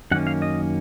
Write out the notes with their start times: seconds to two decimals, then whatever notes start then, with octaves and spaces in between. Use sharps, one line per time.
0.11 F#2 D#3 A#3 C#4 F#5
0.27 F5
0.42 D#5